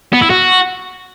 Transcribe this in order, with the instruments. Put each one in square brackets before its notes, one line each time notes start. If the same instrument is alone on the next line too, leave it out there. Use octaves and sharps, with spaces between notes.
[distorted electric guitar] B3
E4
F#4